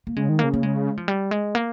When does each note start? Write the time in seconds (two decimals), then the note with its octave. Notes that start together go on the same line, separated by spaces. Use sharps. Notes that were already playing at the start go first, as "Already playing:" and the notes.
0.07 A#3
0.16 C#3 G#3
0.29 D#3
0.39 C#3 A#3
0.54 A#3
0.63 G#3
0.97 F3
1.08 G3
1.31 G#3
1.55 A#3